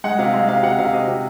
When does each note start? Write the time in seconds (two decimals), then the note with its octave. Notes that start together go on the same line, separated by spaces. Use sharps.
0.04 G#3 F#5
0.19 C3 F5
0.34 G#3 F5
0.49 C3 F5
0.63 C3 F#5
0.79 C3 F5
0.93 C3 D#5
1.08 C3